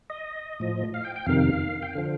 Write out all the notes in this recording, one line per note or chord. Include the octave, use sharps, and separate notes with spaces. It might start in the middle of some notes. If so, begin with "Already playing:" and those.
D#5
A2 F3
F5
G5
G5
F2 C3 D#3 F5
G5
D3 F3 F5